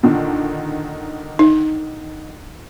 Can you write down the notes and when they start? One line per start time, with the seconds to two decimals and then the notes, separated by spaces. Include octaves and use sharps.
0.03 A#2 D3 D#3
1.39 D#4